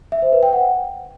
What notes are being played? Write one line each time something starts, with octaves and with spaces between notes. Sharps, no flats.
E5
C5
B4
G5
F#5